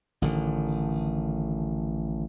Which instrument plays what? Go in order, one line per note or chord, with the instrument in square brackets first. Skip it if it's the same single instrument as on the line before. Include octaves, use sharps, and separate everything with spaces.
[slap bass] A1 D3 D#3